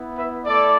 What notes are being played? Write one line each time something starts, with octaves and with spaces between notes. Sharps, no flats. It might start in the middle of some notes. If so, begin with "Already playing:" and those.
Already playing: B3 E4
B4 E5
A3 E4 A4 D5